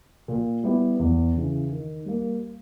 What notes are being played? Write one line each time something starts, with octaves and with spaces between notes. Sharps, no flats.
A#2
G3 B3 E4 G4
E2
C#3 E3
D#3
G3 A#3